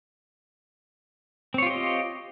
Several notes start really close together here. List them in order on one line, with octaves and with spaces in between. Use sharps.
C4 C#5 F4 G4 D#5